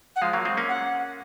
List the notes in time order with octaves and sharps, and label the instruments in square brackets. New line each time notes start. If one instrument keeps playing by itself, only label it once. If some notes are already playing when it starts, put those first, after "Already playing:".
[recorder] F#5
[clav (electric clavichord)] F3 G#3 [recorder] F5
[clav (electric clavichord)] F#3 A#3
G#3 C4
A#3 C#4
[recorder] F#5